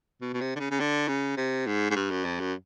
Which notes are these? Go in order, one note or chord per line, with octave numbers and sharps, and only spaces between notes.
B2
B2
C3
D3
C#3
C#3
D3
C#3
C3
G#2
G#2
G2
F#2
F2
F#2